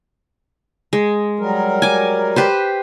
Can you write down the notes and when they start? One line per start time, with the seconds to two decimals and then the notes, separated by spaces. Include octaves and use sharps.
0.93 G#3
1.39 F#3 G3 A#4
1.82 G#5 D6
2.36 G4 B4 C5